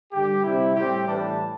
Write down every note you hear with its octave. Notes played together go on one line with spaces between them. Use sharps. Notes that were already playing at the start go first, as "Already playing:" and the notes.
G2 D3 G3 G4
C3 G3 C4 E4
A2 G3 C4 G4
A2 E3 G3 D4 A5